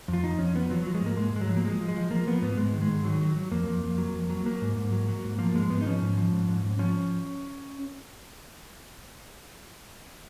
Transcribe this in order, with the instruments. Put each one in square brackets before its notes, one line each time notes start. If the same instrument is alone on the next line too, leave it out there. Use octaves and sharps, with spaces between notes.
[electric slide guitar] F2
F4
F3 D#4
F2 C#4
F3 B3
F3 F#3
F3 F#3
G#3
G#2 A#3
G#2 G#3
G#2 G#3
F#3
F3
A#3
F3 G#3
F3
G#3
F3
F3 A#3
F3 B3
G#2 B3
G#2 G#3
D#3
G#3
G#2
D#3 F#3
F#3
F#3
F2 A#3
F2
F2
F#3
F2
F#3
F#3 A#3
G#2
G#2
F#3
F#3
G#2
F3 A#3
G#2 G#3
G#2 B3
D#4
F3 C#4
G#2
F3
G#2
G#2
G#2
F3 C#4